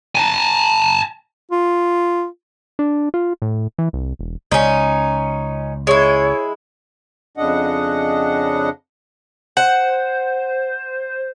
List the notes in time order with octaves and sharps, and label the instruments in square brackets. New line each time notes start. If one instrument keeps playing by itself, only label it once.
[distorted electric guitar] G#5 A5
[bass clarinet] F4
[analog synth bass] D4
F4
A2
E3
C2
E1
[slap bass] C#2 [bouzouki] C#4 D#4
[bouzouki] G#3 E4 [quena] C#5
[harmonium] F2 C#3 D4 D#5 F#5
[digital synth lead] C5 [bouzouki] F#5